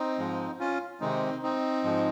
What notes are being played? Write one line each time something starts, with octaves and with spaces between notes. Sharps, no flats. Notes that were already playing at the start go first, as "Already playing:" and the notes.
Already playing: C4 D#4
G#2 F3 G#3
C#4 F4
C3 D#3 G#3 C4 D#4
C4 D#4
G#2 F3 G#3